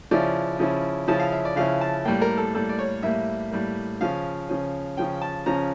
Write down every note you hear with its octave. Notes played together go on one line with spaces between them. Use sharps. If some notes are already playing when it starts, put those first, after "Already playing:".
C#3 F3 C#4 E4 D5
C#3 F3 C#4 E4
C#3 F3 C#4 E4 A5
F5
E5
D5
C#3 F3 C#4 E4 F5
A5
A2 G3 A#3 G5
A#4
A4
A2 G3 A#3 A4
D5
C#5
A2 G3 A#3 E5
A2 G3 A#3
C#3 F3 C#4 F5
C#3 F3 C#4
C#3 F3 C#4 G5
A5
C#3 F3 C#4 A#5